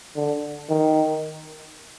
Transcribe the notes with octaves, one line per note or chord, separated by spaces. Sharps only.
D3
D#3